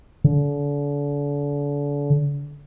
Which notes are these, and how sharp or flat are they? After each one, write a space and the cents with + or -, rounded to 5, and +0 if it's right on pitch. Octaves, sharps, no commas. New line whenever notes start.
D3 -35